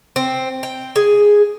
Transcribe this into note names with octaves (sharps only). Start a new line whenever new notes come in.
C4
G5
G#4